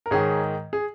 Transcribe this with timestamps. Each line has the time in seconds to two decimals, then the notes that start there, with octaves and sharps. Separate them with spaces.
0.06 A#4
0.11 G#2 D#3 G#4 C#5
0.73 G#4